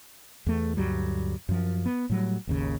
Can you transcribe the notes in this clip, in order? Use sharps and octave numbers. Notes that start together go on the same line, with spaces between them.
E2 A3
D2 G2 F#3 G3
F#2 F3
B3
A2 F#3 G3
G#1 D#2 C#3